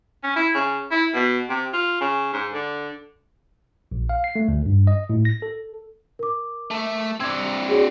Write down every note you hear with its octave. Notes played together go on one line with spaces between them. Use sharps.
C#4
E4
C#3
E4
B2
C3
F4
C#3
G#2
D3
A#1
F5
C7
A3
D2
G2
D#5
A2
A#6
A4
A#4 D6
A3 E5
C4 D4 E6 G#6
F#4 G#4 C#5 D5